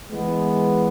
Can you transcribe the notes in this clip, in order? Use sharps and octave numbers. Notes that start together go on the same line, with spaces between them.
E3 G#3 B3